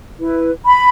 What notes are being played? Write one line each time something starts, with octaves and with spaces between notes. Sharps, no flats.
E4 B4
B5